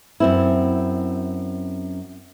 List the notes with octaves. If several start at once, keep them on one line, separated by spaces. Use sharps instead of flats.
F#2 C4 E4